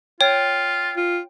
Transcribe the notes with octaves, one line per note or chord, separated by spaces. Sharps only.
F4 C#5 G5
F4